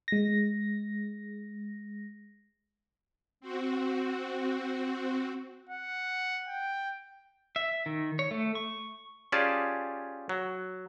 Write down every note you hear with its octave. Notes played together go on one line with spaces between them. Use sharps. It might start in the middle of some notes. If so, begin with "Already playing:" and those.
G#3 A#6
C4 F#4
F#5
G5
E5
D#3
C#5
A3
C#6
C#4 F4 G4 G#4 D5 A5
F#3